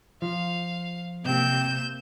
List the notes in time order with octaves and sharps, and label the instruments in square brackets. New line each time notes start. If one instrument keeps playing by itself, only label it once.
[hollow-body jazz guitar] F3 [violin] F5
[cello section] C3 A#3 [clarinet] C4 [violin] G6 E7